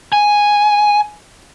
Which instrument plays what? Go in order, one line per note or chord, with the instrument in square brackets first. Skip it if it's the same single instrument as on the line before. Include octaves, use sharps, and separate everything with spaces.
[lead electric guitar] G#5